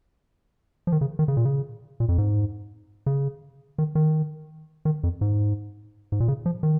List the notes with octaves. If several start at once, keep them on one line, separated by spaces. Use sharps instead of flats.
F3
D#3
C#3
D#3
C#3
A#2
C#3
A#2
F2
G#2
C#3
D#3
D#3
D#3
F2
G#2
G#2
A#2
C#3
F3
D#3